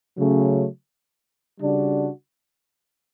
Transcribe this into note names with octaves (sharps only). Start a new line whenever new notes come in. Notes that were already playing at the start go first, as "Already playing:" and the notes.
C#3 F#3 A3 C#4
C#3 G3 D4 F#4